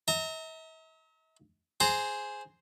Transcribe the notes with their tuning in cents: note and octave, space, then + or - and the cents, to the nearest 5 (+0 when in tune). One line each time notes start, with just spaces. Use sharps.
E5 -45 A#5 -25
G#4 +0 C5 +0 A#5 -30